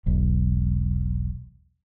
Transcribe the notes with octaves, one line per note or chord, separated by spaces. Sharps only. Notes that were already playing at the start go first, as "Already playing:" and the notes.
E1 B1